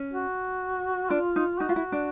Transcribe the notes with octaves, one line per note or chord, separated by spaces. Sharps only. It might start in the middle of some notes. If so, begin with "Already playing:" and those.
Already playing: C#4
F#4
D4 F4
D#4
D#4 F#4
F4
E4
D4